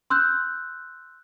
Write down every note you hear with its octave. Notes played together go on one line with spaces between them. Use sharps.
C6 E6 F#6 G6